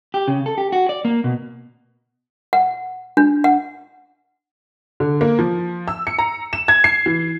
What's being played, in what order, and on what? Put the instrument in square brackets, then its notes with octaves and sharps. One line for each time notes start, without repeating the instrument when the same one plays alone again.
[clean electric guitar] G4
C#3
A4
G4
F#4
D5
A#3
B2
[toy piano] F#5
D4
F#5
[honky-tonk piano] D3
A#3
F3
E6
C#7
A#5
E7
G#6
C7
E3